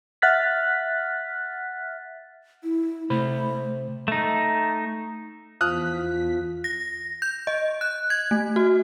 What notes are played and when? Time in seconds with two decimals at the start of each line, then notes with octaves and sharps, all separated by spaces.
0.22 E5 F#5 F6 F#6 A6 B6
2.63 E4
3.10 C3 A3 C5 B5
4.08 A3 D#4
5.61 E2 F3 D#6 F6 F#6 B6
6.64 A#6
7.22 G6
7.47 D#5
7.81 F#6
8.10 G#6
8.31 A3
8.56 F#4